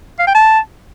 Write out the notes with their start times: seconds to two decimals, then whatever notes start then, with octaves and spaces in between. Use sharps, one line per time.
0.19 F5
0.27 G5
0.35 A5